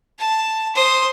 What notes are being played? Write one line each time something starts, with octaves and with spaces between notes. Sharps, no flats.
A5
C5 D#6